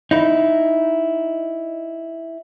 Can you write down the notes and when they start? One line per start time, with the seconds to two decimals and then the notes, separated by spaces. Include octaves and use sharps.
0.11 D#4 E4